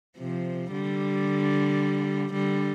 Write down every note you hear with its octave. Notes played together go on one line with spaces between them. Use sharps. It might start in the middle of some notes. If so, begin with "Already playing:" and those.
C3 F3
D3 G3
D3 G3